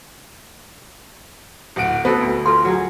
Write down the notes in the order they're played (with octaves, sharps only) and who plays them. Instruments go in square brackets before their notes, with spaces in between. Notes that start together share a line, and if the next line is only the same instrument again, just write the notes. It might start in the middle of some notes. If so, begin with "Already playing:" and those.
[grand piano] D1 F#5 D7
[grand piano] B3 [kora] F#4 A4 [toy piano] C5
[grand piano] D2
[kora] F4 A#4 [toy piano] A4 C6
[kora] F#3 G#4